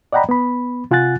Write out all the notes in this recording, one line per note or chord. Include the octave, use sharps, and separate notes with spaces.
D5 D#5 F#5 G5 A#5 B5
B3 B5
C3 F4 F#5 G#5 F#6 A6